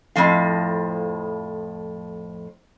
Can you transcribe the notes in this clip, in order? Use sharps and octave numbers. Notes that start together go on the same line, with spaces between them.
F2 A2 F3 F5